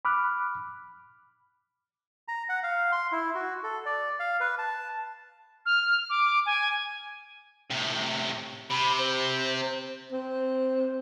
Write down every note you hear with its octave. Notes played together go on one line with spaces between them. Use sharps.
B5 D6 F6 F#6
A#5
F#5
F5
C6
E4
F#4
A4
D5
F5
B4
A5
F6
D6
G#5
A2 C3
C3 B5
C5
C4